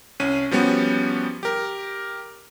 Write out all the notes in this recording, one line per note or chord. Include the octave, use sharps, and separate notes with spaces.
C2 C#4 D#7
F3 G3 B3 C#4 F#4
G4 A#4